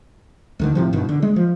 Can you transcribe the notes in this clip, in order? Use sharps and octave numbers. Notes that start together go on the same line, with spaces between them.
D2 D3 D#3
A2 C3 F3
F#1 G2 B2 D#3
D3
G#3
F3